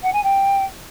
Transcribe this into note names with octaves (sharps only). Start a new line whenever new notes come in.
F#5
G#5
G5